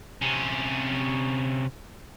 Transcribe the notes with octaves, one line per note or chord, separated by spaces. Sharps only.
C3 C#4